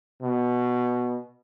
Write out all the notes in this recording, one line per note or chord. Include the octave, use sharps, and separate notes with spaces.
B2